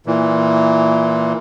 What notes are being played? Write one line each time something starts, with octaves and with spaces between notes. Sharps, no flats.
A#2 E3